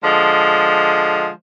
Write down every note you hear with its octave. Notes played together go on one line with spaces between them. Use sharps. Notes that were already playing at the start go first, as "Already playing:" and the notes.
D3 F3 G#3